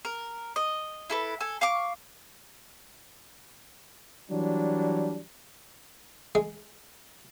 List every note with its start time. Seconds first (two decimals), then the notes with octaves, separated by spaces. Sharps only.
0.05 A#4
0.56 D#5
1.10 E4 A4 B4
1.40 A4 G#5
1.61 F5 C#6 D6
4.31 E3 F#3 G3 D4
6.35 G#3